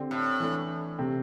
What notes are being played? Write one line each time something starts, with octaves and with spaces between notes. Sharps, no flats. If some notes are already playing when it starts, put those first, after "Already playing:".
Already playing: D3 C4 G4
A2
E3 A3 D4
C3 A3 C4 G4